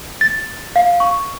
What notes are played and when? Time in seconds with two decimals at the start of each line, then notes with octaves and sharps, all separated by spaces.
0.21 A6
0.76 F5
1.00 C#6